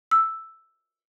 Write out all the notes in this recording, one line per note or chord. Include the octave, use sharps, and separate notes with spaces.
E6